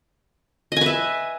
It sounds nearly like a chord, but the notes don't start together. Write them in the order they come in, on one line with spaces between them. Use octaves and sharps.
D#5 G#5 B4 E5